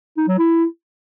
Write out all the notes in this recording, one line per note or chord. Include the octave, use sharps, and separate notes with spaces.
D#4
F#3
E4